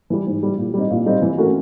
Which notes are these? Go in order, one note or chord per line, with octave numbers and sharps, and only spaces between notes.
E3 G3
G#2
E3 G3
A#2
G3 C4 D#4
A#2
G3 C4 D#4
E3
A3 C#4 F#4 A#4